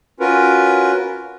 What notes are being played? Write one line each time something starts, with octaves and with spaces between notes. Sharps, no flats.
C#4 F4 F#4 A#4 B4